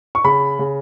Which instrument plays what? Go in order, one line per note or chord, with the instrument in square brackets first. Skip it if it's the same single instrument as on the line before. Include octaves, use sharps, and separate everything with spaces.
[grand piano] C#6
[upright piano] C#3 [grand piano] B5
[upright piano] C#3